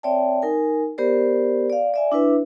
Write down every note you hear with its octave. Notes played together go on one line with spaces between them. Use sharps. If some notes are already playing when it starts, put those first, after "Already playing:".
C4 C#5 D5 E5 G5 A5
D#4 A#4 G#5
B3 G4 A#4 C5 D5
D5 F5
D5 E5 G#5
D4 E4 B4 E5